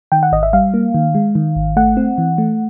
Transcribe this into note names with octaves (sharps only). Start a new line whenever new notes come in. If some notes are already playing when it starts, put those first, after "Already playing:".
D#3 G5
F#5
G#1 D#5
E5
G3 F5
A#3
D#3
G#3
D#3
G#1
A3 F#5
C4
E3
A3